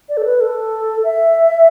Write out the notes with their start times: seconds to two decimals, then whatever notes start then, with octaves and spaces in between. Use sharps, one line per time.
0.09 D5
0.17 A4
0.25 B4
0.40 A4
1.04 E5